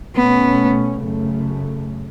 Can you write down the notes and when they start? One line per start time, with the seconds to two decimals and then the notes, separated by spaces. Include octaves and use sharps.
0.15 B2 A3 B3 C#4
1.01 F#2 C#3 A3